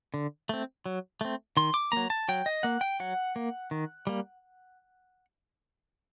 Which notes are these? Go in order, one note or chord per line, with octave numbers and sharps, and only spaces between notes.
D3
A3 C4
F#3
A3 C4
D#3 C6
D6
F#3 A#3 A#5
A5
F#3 G5
D#5
A#3 F#5
G5
F#3 F#5
A#3
D#3
G3 A#3